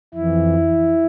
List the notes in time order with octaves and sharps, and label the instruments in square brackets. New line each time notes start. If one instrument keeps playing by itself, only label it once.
[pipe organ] F2 E3 E4